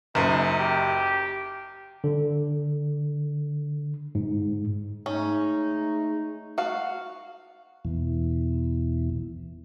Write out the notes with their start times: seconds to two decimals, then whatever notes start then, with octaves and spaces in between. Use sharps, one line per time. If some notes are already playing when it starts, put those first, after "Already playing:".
0.15 F#1 F#2 D#4
0.59 G4
2.04 D3
4.15 G#2
5.06 G#3 A3 C#4 D#4
6.58 F#4 F5
7.85 E2 B2 E3